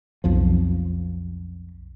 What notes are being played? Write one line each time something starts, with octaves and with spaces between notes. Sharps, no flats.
B1 F2 F3